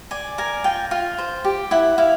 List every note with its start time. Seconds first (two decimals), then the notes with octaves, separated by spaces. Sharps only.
0.11 D5 G#5
0.38 A#4 G#5
0.64 F4 G5
0.91 F4
1.18 C5
1.45 G4
1.71 E4 F#5
1.98 E4 F5